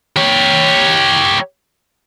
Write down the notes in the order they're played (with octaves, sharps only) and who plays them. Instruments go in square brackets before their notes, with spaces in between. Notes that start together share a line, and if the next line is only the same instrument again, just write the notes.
[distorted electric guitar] G4 C#5